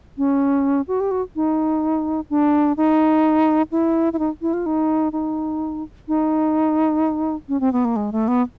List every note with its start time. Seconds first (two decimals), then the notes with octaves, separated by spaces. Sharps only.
0.18 C#4
0.88 F#4
1.00 G4
1.11 F#4
1.36 D#4
2.30 D4
2.77 D#4
3.72 E4
4.13 E4
4.19 D#4
4.42 E4
4.53 F4
4.66 D#4
5.12 D#4
6.08 D#4
7.49 C#4
7.60 C4
7.73 B3
7.85 A#3
7.96 G#3
8.12 A3
8.28 B3